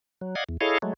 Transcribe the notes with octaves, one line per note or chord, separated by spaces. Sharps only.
F#3
D5 D#5 F5 F#5 G#6
E2
E4 G#4 A4 C#5 D#5 F5
F#3 G#3 A3